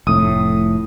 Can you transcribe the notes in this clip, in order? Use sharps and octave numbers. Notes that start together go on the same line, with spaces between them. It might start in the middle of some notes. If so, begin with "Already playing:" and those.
F1 A2 D#6